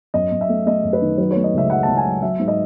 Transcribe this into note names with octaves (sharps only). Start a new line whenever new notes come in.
F#2 D#5
F#2
E5
A3
A3 D#5
F#2
B4
D#3
F#3 B4
A3 C#5
D#5
C#2 E5
F#3 F#5
C#2 A5
G#5
F#3
F#3 E5
G#2
D#5